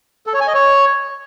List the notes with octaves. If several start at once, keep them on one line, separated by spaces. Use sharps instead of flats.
A4
C#5
G#5
D#5
C#5